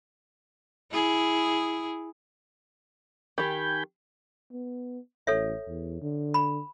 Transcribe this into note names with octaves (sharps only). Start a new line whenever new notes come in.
E4 G#4
D#3 G4 G#5 B5 G6
B3
A1 A4 C#5 E5
E2
D3
B5